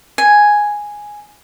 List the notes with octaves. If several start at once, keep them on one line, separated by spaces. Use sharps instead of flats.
G#5